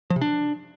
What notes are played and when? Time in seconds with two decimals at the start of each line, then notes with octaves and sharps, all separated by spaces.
0.10 F3
0.16 C3
0.21 D4